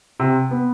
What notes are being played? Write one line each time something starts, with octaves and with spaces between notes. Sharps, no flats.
C3
B3